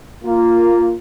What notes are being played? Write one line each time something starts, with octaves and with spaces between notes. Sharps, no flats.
A#3 F4